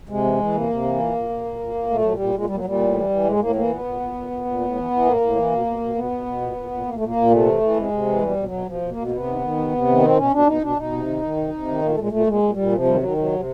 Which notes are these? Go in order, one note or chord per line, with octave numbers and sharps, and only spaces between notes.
C3 G#3
E3
E3
C3 A#3
C3
E3
A#2
A#2
A#2
A#2
A#2
A#2
A#2 A3
A#2 F#3
G3
A#2
A#2 G#3
A#2 G3
F#3
A#2 G3
A2
E3
E3
A2 G#3
A2 A#3
E3 A#3
A#2 B3
A#2
A#2
A#2
A#2
A#2
A2
E3
E3
A2 A#3
A2
E3
B2
B2
B2
B2 B3
B2
B2
A#2
A#2
A#2
A#2 A#3
A3
A#2 A#3
A#2
C3 A3
E3
E3
C3 G#3
C3
E3
B2 G3
B2 F3
F#3
B2
B2 F3
B2
A#3
B2
A#3
C3 B3
D#3
D#3
C3
C3
D#3
B2 C4
B2 C#4
B2 D4
B2 D#4
B2 D4
B2 D#4
C3
D#3
D#3
C3
C3
D#3
A#2 A#3
A3
A#2 G#3
A#2 A3
A#2 G#3
A#2
G3
A#2
C3 F3
D#3 G3
F#3
D#3
C3 F#3
C3